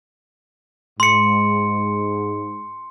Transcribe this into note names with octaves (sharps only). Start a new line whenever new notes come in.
G#2 C6 C#7